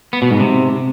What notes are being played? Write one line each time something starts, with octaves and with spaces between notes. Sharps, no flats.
B3
B2
G#2
C3